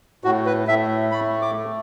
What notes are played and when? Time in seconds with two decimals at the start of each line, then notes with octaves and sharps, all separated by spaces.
0.24 A2 F#4
0.46 B4
0.68 A2 E5
1.12 A3 B5
1.42 D6
1.56 A3